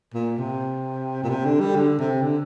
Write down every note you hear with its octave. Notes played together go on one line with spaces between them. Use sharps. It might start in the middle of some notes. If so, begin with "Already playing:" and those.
A#2
C3
A#2
C3
D3
G3
D3
C3
D3